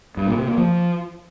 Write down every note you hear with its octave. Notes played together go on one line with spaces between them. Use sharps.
G2
A#2
C3
A#3
F3